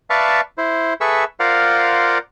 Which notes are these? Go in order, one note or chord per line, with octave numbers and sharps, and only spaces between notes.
B4 D5 E5 F5 A5 C#6
E4 C5
G#4 A4 B4 E5 C#6 E6
F4 A#4 C5 D5 F5 F#5